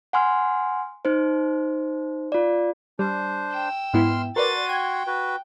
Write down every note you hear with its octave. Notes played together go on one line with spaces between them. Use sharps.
F#5 G#5 C6 F6
D#4 C5
F4 D5
G3 D4 C5
G5 E6
G#2 B3 E4 C6 F6
F#4 A#4 B4 D5 F#5 C6 A6 D#7
G5 G#6
F#4 B4